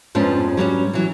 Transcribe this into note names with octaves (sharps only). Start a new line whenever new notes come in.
F2 G#2 F3 B3 C#4 D4
F#3 G3 B3 C#4
E3 F#3